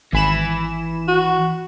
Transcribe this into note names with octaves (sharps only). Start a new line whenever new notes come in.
G#1 E3 G#5 B5 E7
F#4